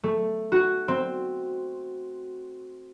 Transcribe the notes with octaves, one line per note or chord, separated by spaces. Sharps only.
A3
F#4
C4